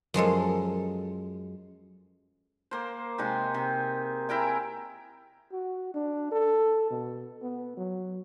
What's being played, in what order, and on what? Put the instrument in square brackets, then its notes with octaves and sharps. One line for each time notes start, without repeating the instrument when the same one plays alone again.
[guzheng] F#2 F3 G#3 A4
[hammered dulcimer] A#3 C5
C3 G#3 D#4
C3
E4 A#4 G5 G#5
[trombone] F#4
D4
A4
B2
B3
F#3